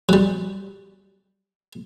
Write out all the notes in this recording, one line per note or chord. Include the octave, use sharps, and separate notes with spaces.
F#3 G3